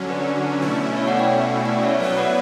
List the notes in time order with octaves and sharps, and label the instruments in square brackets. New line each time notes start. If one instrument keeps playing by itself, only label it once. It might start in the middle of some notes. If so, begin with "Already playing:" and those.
Already playing: [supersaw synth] D3 F#3 C#4
[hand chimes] B4 D5
[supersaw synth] B2 A3 C#4 E4
[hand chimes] C#5 E5
D5 F#5
E5 G5
D5 F#5
C#5 E5
[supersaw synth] F#3 B3 E4 B4 [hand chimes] C#5 E5
[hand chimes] D5 F#5